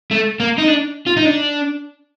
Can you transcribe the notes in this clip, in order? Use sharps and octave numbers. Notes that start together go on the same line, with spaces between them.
A3
A#3
D#4
D4
F4
D#4
D4